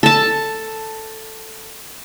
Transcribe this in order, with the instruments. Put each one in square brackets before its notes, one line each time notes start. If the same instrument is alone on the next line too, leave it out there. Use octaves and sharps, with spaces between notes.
[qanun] A4 A5